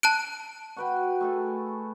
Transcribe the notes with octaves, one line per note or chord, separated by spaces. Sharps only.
A5 F#6 D7
F#4 B4 G5
A3 G#4 A4